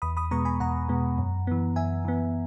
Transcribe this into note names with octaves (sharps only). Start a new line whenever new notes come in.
E2 B5 D#6
B5 D#6
B2 G#3 B3 A#5 C#6
G#5 B5
E2 F#5 A#5
B2 G#3 B3
F#2
E3 B3
F#2 E5 G#5
E3 B3